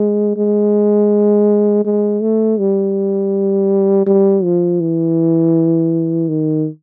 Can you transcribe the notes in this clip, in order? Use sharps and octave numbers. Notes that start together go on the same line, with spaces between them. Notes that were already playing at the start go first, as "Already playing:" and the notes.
Already playing: G#3
G#3
G#3
A3
G3
G3
F3
E3
D#3